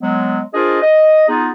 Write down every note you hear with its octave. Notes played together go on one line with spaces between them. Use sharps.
F#3 G#3 B3
D4 F4 G#4 A#4 C5 D#5
D#5
B3 D#4 F4 G#4